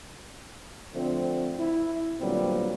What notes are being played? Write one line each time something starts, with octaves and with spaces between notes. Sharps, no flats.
D3 F3 A3 C4
E4
A#2 D3 F#3 G3 B3 C4